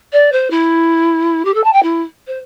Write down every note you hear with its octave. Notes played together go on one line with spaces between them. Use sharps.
D5
C5
E4
G4
A4
A5
G5
E4
C5